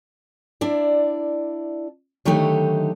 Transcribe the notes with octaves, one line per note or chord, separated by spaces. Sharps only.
D4 E4 D5
D3 D#3 F#3 A3 D#4 G4